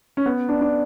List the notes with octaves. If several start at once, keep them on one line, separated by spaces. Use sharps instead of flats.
C#4
B3
D4
D4